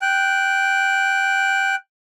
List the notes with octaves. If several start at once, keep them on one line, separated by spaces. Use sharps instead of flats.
G5 F#6